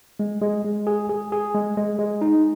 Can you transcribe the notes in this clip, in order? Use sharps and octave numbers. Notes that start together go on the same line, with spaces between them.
G#3
G#3
G#3
G#4
G#4
G#4
G#3
G#3
G#3
D#4